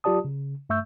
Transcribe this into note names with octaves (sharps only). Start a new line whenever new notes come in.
F#3 F4 G4 D5 A5 D#6
C#3
G2 A3 E5 C#6 E6 G6